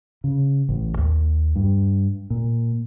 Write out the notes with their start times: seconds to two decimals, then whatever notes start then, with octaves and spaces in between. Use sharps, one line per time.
0.24 C#3
0.69 A1
0.98 D#2
1.56 G2
2.30 A#2